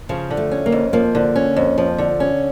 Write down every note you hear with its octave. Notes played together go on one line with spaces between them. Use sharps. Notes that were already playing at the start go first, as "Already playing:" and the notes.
C#3 F3
D3
A3
C#4
A#3
F2
F3 A#3
D3
C#4
F2
F3
D3
C#4